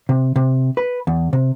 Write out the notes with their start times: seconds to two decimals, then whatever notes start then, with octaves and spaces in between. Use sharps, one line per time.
0.09 C3
0.36 C3
0.77 B4
1.07 E2
1.33 C3